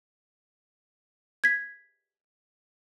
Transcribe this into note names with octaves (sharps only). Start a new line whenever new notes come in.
G#6 B6